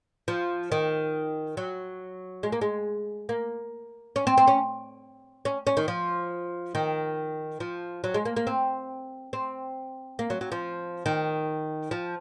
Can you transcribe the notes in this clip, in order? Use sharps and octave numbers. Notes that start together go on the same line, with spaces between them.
F3
D#3
F#3
G#3
A#3
G#3
A#3
C#4
C4
C4
C#4
C#4
C#4
D#3
F3
D#3
F3
F#3
G#3
A#3
A#3
C4
C4
A#3
F#3
F#3
F3
D#3
F3